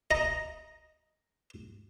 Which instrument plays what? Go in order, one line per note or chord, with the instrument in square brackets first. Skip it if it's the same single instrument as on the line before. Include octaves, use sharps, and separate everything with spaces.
[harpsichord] D#5 A#5